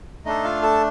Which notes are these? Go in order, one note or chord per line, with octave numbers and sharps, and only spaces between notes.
A3 D4 D#4 A4 D#5
F4 F5
A4 A5